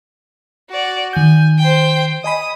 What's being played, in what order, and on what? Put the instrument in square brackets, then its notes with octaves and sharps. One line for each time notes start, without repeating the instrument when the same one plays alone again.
[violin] F#4 D5
[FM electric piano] D#3 G6 [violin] G#5
[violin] C5 G5
[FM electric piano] D#5 G#5 B5 [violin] D#6